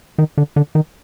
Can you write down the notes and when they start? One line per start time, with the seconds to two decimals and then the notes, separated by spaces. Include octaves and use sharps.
0.18 D#3
0.38 D3
0.56 D3
0.75 D#3